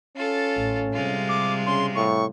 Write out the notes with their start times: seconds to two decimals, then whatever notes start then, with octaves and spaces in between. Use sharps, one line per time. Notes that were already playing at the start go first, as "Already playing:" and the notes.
0.16 C#4 F4 A4
0.57 A1
0.93 C3 G3 G#3 F4
1.29 D6
1.66 C#3 C6
1.95 A2 C#6